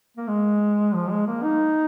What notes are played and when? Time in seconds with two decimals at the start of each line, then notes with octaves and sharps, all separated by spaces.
0.17 A#3
0.28 G#3
0.94 F3
1.11 G#3
1.27 A#3
1.43 D#4